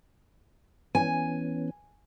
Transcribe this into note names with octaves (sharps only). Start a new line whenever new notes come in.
E3 B3 C#4 G#5